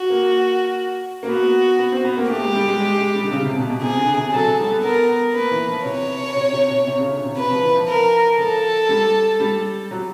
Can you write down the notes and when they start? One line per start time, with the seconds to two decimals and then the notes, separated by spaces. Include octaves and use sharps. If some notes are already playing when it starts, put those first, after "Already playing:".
Already playing: F#4
0.10 A#3
1.23 A#3
1.29 B3 F#4
1.79 B3
1.92 C4
2.05 B3
2.17 A#3
2.30 A3 G4
2.42 G#3
2.55 G3
2.68 G#3
2.80 G#3
2.97 G#3
3.15 G3
3.23 D3
3.31 C#3
3.44 C3
3.56 B2
3.69 B2
3.82 C3 G#4
3.99 D3
4.16 C3
4.33 F#3 A4
4.45 F#3
4.58 G3
4.71 B3
4.83 B3 A#4
5.34 A#3 B4
5.51 E3
5.68 F3
5.85 C3 C#5
6.35 C3
6.52 C3
6.69 B2
6.87 C3
6.99 C#3
7.12 D3
7.25 C3
7.37 C3 B4
7.50 F3
7.63 E3
7.75 F3
7.88 A#4
8.39 F3 A4
8.89 G3
9.40 G3
9.91 F#3